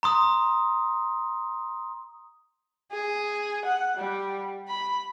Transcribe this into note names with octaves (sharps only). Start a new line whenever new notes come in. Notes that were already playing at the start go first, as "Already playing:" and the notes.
A#5 C6 D#6
G#4
F#5
G3
B5